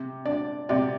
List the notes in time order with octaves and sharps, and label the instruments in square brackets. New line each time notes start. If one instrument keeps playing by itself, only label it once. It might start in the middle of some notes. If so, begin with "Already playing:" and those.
Already playing: [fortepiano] C3
D4 D5
C3 D5